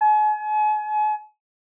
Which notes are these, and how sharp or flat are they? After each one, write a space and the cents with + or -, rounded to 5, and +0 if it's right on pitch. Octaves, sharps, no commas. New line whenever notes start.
G#5 +40